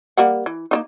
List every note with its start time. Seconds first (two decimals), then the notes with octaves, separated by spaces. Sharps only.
0.17 G3 A#3 F#5
0.46 E3
0.71 A#3 D4 D#4